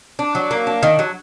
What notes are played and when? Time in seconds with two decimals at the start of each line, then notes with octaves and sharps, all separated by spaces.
0.19 D4
0.35 F#3
0.51 A#3
0.67 D4
0.83 D#3
0.99 F#3